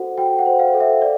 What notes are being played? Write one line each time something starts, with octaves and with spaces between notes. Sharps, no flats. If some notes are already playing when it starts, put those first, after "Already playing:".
Already playing: F#4 A4 C5 F#5
F#4 G5
F#5
C5
F5
A4
E5
D5